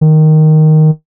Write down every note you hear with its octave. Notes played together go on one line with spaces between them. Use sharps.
D#3